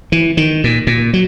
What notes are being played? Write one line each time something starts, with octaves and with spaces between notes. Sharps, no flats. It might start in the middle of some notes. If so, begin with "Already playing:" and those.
E3
D#3
A#2
A#2
F#3